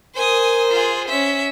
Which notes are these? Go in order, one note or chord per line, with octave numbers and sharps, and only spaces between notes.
A#4 C5 G#5 D#6
F4 G#4
C4 C#4 E5